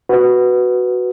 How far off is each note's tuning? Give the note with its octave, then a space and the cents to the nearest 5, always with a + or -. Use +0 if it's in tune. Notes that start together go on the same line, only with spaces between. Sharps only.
F#4 +0 B4 +0